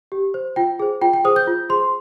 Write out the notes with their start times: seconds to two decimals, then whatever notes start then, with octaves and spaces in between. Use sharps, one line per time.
0.12 G4
0.34 C5
0.56 F4 G5
0.79 G#4 C5
1.02 F4 G5
1.13 G5
1.24 G#4 C5 D#6
1.36 G6
1.47 F4
1.69 G#4 C5 C6